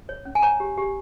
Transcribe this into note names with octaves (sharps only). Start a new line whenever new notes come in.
C#5
C#4
G#5
C#5 A#5
G4
G4